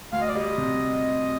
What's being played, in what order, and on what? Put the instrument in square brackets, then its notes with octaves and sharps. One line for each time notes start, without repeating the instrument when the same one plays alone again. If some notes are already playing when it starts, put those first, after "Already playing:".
[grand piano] D2 [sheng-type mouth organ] F5
[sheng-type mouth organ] D#5
D5
[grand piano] G3 [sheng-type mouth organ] D#5
[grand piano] C3